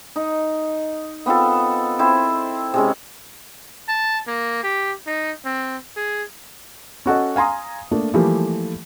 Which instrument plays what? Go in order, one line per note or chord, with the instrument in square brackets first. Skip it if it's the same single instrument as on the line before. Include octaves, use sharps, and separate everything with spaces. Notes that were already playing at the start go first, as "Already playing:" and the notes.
[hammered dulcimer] D#4
B3 C4 F4 A4
C4 E4 C5
C3 G#3 C#4
[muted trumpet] A5
A#3
G4
D#4
C4
G#4
[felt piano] C#4 F#4 A4 D#5
F5 G#5 A#5 C6 D#6
A3 A#3 D4
E3 F3 G3 A3 A#3 G4